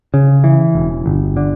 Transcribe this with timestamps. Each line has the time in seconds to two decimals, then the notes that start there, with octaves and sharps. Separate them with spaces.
0.14 C#3
0.44 E3
0.75 E1
1.06 G1
1.37 D3